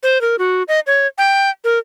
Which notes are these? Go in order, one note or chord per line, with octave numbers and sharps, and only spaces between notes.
C5
A#4
F#4
D#5
C#5
G5
A#4